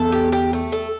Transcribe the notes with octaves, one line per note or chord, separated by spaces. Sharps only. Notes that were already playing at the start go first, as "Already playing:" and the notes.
Already playing: E2 A4
G4
G4
A3
A4